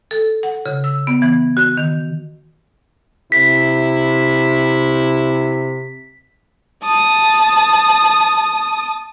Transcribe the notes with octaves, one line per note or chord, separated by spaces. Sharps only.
A4
F#5
C#3
E6
B3
E3
F#4
D#3
C3 E4 B6
A5 D#6